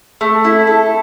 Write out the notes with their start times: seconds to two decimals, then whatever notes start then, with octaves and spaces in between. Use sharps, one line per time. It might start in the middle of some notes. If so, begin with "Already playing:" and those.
0.21 A3
0.44 E4
0.67 A4